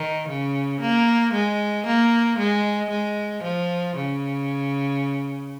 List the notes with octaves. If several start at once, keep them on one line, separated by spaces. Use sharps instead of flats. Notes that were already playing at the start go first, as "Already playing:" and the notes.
Already playing: D#3
C#3
A#3
G#3
A#3
G#3
G#3
F3
C#3